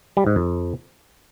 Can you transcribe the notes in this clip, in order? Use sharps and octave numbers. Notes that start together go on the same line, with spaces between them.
G3
G#2
F2